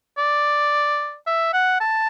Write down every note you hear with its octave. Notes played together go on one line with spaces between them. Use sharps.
D5
E5
F#5
A5